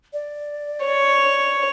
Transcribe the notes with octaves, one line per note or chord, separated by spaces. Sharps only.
D5
C#5